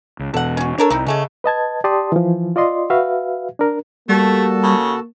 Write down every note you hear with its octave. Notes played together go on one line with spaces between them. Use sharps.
C#2
E2 B2 A4 F#5
C#4 F#4
D4 A4 A#4 C#5
C2 C4 D#4 E4
C#3 G#3 A3 C#4
B4 D#5 A5 G#6
G4 D5 A5 C6 D#6
E3 F3
F4 D5 D#5 C6
F#4 B4 E5 F5
D4 A#4
G3 A3 A#3 F#4 A4 A5
C#3